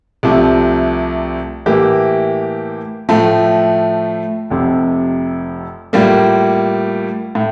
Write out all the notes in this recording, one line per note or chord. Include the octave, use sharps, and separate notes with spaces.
C2 C3 F3 A3
A2 E3 A#3 E4 G4
A2 F3 A3
F1 F2 C3
A2 G3 A#3 F4
A2